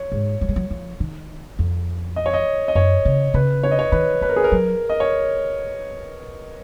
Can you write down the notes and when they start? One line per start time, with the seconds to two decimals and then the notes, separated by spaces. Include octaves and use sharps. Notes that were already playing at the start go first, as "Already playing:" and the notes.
Already playing: C#5
0.12 G#2
0.41 F#3
0.49 G#3
0.56 F#3
0.71 F3
1.00 D#3
1.59 F2
2.16 D#5
2.26 C#5
2.33 D#5
2.68 D#5
2.75 F#2 C#5
3.05 C#3
3.34 C#3 B4
3.63 C#5
3.71 D#5
3.79 C#5
3.92 D#3 B4
4.21 F#3 B4
4.29 A#4
4.36 G#4
4.44 A#4
4.52 F#3
4.90 D#5
5.00 C#5